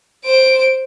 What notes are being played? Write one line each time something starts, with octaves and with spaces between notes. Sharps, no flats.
C5 D7